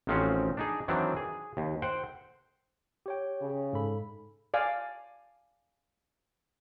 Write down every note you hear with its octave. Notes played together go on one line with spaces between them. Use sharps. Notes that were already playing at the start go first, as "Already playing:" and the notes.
A1 D#3 F3 C4 C#4 F#4
D4 D#4 G#4
D#3 E3 F#3 C4 D4
G#4
D#2
C5 F#5 G5
G4 C#5 G5
C#3
G#2 A4 B5
D5 F5 G#5